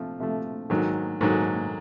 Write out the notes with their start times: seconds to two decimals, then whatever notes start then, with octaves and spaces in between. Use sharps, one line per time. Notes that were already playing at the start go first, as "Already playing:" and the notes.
Already playing: C3 F3 A3
0.20 C3 F3 A3
0.70 G#2 D#3 F#3
1.21 G#2 D#3 F#3